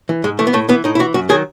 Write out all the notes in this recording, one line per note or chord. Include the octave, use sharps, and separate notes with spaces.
E3
G#2 G#3
E3 A3
B3
A2 A3
E3 B3
A2 D#4
E4
E3 F#4
F#2 F#4
D#3 F#3 G#4